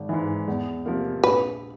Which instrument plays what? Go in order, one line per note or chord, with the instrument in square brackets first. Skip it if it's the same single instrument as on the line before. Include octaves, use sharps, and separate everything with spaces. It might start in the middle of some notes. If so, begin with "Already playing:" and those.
Already playing: [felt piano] G#1
G#2 E3
E2
C3 F3 A#3
[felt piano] A#1 [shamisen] B4